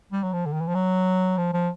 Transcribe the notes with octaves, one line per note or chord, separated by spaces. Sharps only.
G3
F#3
F3
D3
D#3
E3
F3
F#3
F3
F3